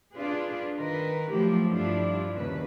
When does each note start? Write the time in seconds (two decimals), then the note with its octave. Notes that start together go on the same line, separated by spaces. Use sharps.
0.13 D4 F4 G#4 B4
0.77 D#3 D#4 A#4 B4
1.32 F3 F#3 A3 E4 G4
1.69 G2 F3 G3 D4 E4 F4
2.36 D#2 C#3 B4